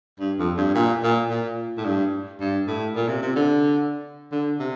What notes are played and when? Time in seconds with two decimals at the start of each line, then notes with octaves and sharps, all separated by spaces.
0.20 G2
0.39 F2
0.57 G2
0.75 A#2
1.03 A#2
1.30 A#2
1.77 A2
1.85 G2
2.40 G2
2.67 A2
2.95 A#2
3.08 C3
3.22 C3
3.36 D3
4.32 D3
4.60 C3